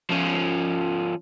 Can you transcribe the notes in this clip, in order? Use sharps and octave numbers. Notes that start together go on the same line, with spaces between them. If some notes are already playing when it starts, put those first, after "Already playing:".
F3 C#4